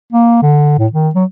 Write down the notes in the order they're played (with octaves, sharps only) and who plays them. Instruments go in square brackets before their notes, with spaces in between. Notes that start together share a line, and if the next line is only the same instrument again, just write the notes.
[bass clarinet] A#3
D3
A2
D#3
F#3